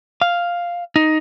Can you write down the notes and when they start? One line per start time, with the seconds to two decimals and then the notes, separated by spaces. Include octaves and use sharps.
0.21 F5
0.96 D#4